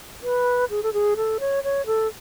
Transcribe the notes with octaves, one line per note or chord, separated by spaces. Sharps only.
B4
G#4
A4
G#4
A4
C#5
C#5
A4